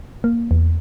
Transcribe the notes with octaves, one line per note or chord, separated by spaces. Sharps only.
A#3
E2